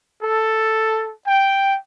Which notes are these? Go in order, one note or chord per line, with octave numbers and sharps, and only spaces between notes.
A4
G5